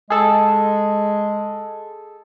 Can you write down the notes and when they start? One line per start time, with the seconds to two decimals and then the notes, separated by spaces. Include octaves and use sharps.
0.10 G#3 G#4 A4